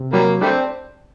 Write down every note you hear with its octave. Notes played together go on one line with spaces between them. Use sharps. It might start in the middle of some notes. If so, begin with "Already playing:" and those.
Already playing: C3
F#3 G3 A#3
G3 A3 C4 D4